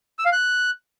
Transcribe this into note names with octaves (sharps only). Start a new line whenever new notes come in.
E6
F5
F#6